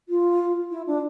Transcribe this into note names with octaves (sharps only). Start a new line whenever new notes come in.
F4
E4
D4